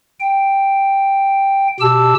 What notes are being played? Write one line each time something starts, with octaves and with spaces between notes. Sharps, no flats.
G5
B2 G4 A5 E6